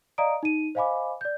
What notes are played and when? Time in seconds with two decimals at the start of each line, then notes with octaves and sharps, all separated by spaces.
0.18 D5 D#5 F5 A#5 D#6 D7
0.43 D#4 D#7
0.75 C5 D#5 F5 G#5 B5 D6
1.21 D5 G6